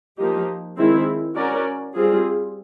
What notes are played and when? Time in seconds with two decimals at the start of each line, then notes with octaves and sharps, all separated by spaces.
0.18 F3 A#3 D#4 G4
0.77 D#3 G#3 C4 E4
1.36 C#4 F#4 A#4 D5
1.95 G3 C4 F4 G#4